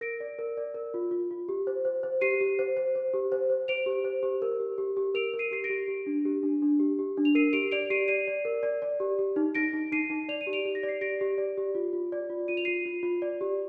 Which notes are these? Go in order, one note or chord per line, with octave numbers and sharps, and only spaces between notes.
A#4 A#6 D7
D5
A#4
D5
A#4
F4
F4
F4
G4
C5
C5
C5
G4 C7 D#7
G4
C5
C5
C5
G4
C5
C5
C5 D7 F7
G4
C5
G4
A#4
G4
G4
G4
A#4 D7 F7
A#4
C7 D#7
G4 C7
A#6 D7
G4
G4
D4
G4
D4
D4
G4
G4
D4
F7
A#4 C7 D#7
G4 D7 F7
D5 D7 F7
G4 C7 D#7
D5 C7 D#7
D5
A#4
D5
D5
G4
G4
D#4
D#4 A#6 D7
D#4
D#4 C7 D#7
D#4
D5 F7
D#7
G4
D7 F7
G4
A#6
D5
C7
G4 A#6 D7
G4
D5
G4
F4
F4
D5
F4
F4 D#7
F7
F4 C7 D#7
F4
F4
D5
G4